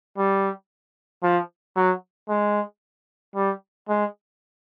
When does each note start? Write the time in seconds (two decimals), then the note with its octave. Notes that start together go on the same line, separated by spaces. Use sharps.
0.18 G3
1.23 F3
1.76 F#3
2.29 G#3
3.36 G3
3.89 G#3